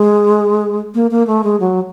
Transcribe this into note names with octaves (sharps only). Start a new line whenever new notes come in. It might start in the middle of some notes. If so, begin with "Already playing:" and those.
Already playing: G#3
A#3
A#3
A3
G#3
F#3